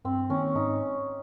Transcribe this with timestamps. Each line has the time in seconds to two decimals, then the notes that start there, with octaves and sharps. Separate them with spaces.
0.05 G2 C4
0.30 D#3 A#3 C#4
0.55 G#2 D#4